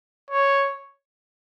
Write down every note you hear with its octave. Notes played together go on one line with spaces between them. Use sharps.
C#5